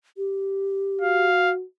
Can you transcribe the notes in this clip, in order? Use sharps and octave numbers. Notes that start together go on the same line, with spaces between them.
G4
F#4 F5